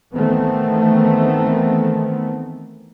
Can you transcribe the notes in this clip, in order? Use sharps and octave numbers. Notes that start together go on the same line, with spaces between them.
D#3 E3 A3 B3 C4